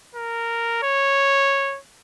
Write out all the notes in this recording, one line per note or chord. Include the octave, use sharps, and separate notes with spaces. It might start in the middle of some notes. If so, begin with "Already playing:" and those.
A#4
C#5